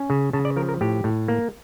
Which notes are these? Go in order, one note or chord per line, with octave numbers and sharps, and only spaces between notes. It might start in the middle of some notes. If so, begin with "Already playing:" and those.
Already playing: C#4
C#3
C#3 A5
D5
F3 A#4
A#4
A2 G4
A2
A#3